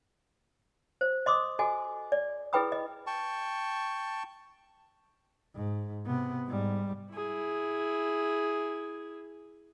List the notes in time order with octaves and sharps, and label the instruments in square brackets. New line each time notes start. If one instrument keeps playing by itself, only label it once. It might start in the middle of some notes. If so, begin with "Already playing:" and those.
[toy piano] C5
D#5 C6 D6 D#6
F#4 A4 D#5 G#5
D5
E4 G#4 B4 G5 B5 D#6
D#5
[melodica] G5 A5 C#6
[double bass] G#2
C3 B3
G#2 G3
[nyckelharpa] E4 G#4